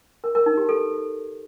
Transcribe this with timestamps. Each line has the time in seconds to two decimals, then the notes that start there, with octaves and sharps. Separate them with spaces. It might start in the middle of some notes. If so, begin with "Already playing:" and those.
0.24 A#4
0.35 A#4
0.46 D#4
0.57 G4
0.69 A4